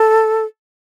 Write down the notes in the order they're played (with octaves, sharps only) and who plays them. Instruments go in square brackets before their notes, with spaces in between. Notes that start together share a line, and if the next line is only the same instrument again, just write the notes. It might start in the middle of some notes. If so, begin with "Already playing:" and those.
Already playing: [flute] A4